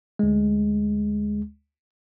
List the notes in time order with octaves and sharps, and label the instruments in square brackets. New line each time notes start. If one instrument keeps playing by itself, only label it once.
[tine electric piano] D2 G#3